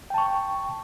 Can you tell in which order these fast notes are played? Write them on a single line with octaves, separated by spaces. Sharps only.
G5 A5 C#6